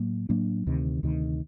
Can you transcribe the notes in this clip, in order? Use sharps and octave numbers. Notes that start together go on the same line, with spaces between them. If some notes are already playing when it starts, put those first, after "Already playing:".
Already playing: A2 F#3 A#3
A2 F#3 A#3 D4
D2 C3 D#3
D2 C3 D#3